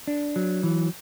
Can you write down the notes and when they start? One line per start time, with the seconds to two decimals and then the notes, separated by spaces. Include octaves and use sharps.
0.07 D4
0.36 F#3
0.63 E3